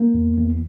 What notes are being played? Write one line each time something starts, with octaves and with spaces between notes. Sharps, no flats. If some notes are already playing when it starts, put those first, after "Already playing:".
Already playing: A#3
E2
E2